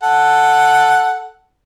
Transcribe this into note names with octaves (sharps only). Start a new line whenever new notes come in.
A4 F#5